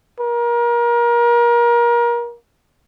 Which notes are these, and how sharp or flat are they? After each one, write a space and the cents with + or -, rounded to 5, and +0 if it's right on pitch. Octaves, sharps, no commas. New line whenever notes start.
A#4 +30